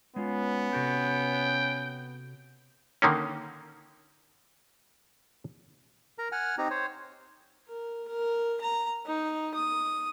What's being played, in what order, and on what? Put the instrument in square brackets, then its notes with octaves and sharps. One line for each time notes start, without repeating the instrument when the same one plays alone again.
[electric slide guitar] G#3 F4 [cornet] B3 [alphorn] C#4
[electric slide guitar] C3 F#4 A4 [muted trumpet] G5
[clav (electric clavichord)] D3 D#3 A#3 C#4
[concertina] A#4 A#5
F#5 G#5 F6
C4 D#4 G4 A#5
C5 C#5
[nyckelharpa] A#4
A#4
A#5
D#4
D#6